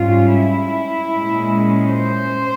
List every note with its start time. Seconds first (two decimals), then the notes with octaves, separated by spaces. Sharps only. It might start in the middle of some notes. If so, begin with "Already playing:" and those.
Already playing: G#2 G3 C#4 F4
0.35 E4
1.12 A#2 G#3 C#4
1.90 C5